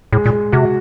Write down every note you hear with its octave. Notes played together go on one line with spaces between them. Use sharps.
A2 G#3
A#2
G#3
C3 F#4